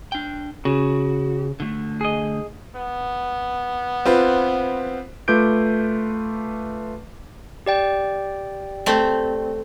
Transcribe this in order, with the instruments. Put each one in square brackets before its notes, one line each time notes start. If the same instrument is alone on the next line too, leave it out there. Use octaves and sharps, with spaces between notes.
[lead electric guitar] D4 G5
[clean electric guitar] C#3 [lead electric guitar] F#4
[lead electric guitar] D3 A3
[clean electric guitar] G#4 D#5
[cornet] B3
[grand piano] C4 F4 B4
[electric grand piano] A3 F4 B4 D6 G6 D7
[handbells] G4 D5 G5
[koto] A3 C4